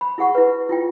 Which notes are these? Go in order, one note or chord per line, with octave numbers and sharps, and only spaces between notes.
B5
E4 G#4 F#5 C#6
E4 B4
E4 F4 G5